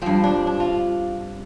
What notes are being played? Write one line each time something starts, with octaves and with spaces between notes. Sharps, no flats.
G2 F3 C4
D4
D4
F4